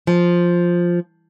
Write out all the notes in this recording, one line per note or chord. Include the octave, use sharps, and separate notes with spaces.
F3